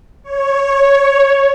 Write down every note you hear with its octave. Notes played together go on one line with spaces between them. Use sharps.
C#5